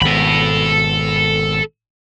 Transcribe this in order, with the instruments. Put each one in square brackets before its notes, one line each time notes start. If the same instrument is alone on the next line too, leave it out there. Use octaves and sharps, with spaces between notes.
[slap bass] G#1 B2 [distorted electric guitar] A4 B5